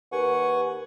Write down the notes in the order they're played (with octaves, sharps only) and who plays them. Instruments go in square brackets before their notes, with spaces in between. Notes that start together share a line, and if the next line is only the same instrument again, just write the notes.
[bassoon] D#2 [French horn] B4 [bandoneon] F#5 G#5 C#6